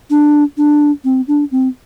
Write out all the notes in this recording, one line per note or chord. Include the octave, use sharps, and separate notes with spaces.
D4
D4
C4
D4
C4